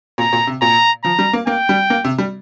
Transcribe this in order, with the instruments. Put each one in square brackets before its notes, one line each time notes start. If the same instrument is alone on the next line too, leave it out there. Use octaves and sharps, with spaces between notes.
[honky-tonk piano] A#2 [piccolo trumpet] A#5
[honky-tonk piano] A#2
C3
[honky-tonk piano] A#2 [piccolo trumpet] A#5
[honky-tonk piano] F3 [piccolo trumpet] A#5
[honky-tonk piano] G3
A#3
[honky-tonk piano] A#3 [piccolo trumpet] G5
[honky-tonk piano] G3
A#3
C3
G3